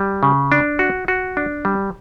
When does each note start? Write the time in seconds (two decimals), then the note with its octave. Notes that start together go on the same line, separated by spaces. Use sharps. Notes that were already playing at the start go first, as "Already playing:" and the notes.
Already playing: G3
0.23 C#3
0.52 D4
0.79 F#4
1.08 F#4
1.37 D4
1.65 G3